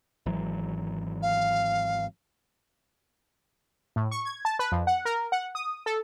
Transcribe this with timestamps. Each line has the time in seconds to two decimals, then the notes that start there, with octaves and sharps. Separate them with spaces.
0.26 G#1 E3 F#3
1.22 F5
3.96 A2
4.11 C#6
4.25 G#6
4.45 A5
4.59 B4
4.72 F2
4.87 F#5
5.05 A#4
5.32 F#5
5.55 D#6
5.86 A4